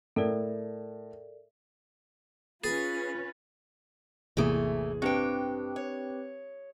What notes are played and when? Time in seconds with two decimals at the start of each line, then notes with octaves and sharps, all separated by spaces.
0.16 A2 A4 A#4 D5
2.64 C#4 F4 G#4 B4 A6
4.37 A1 E2 C3 E3 A3 A#3 G#4 D#6
5.02 G2 C4 D4 G4 B4 G5
5.76 C#5